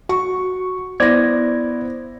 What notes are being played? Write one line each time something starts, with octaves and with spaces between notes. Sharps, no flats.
F#4 C#6
B3 E4 C5 D5 G#6 A#6